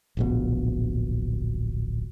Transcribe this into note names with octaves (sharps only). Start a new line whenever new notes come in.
D1 A#1 B2